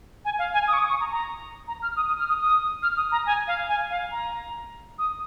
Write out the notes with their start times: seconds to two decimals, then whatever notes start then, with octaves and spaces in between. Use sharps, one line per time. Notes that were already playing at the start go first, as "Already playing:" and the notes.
0.25 G#5
0.39 F5
0.54 G#5
0.68 D#6
0.73 C#6
0.78 D#6
0.89 C#6
1.00 A#5
1.11 A#5
1.68 A#5
1.82 F6
1.96 D#6
2.07 D#6
2.19 F6
2.29 D#6
2.39 D#6
2.82 F6
2.97 D#6
3.12 A#5
3.26 G#5
3.47 F5
3.69 G#5
3.90 F5
4.11 A#5
4.98 D#6